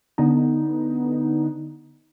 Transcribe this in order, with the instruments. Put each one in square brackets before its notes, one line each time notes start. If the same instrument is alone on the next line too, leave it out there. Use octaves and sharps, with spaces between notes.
[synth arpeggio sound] D3 B3 D#4